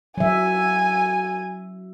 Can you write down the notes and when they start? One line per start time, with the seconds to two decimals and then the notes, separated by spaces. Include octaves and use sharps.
0.17 F#3 E5 G#5